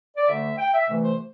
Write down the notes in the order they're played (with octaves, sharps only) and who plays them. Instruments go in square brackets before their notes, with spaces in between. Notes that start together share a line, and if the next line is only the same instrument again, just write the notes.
[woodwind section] D5
D2 D3 A3 E5
G5
E5
C2 C3 E3 A3
C5